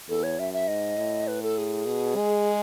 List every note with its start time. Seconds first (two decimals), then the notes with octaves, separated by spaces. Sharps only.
0.09 E2 A4
0.23 C#5
0.38 F#2 E5
0.53 E5
0.68 G#2 D#5
0.98 A2
1.27 B4
1.43 A4
1.58 G#4
1.87 B2
2.17 G#3